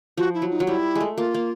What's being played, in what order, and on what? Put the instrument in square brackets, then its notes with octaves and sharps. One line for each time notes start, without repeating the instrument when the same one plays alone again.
[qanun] F3 [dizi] F#4
[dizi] E4
[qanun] F#3
[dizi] D#4
[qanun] F#3
[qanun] G3 [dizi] E4
[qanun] G#3
A3
[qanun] A#3 [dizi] F4
[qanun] A#3